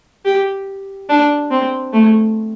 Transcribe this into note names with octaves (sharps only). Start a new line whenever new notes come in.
G4
D4
C4
A3